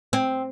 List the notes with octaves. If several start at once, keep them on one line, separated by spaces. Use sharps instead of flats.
C4